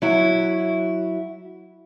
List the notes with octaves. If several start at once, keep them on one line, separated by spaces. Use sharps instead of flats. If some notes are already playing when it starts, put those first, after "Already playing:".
F#3 E4